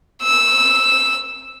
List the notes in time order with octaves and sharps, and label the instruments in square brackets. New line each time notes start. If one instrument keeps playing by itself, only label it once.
[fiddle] E6